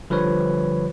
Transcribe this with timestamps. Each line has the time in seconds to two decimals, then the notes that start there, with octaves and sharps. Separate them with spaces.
0.10 D3 F3 G3 B4 C#5